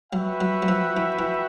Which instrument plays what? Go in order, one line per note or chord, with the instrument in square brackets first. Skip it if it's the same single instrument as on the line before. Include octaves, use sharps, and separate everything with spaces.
[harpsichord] F#3 [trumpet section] F#4 B4 E5 G5
[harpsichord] F#3
F#3
F3
E3
E3